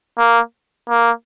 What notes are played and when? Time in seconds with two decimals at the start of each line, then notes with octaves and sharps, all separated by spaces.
0.18 A#3
0.89 A#3